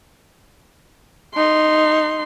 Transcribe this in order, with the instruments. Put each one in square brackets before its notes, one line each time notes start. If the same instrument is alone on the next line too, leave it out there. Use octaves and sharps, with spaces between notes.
[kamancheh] D#4 C6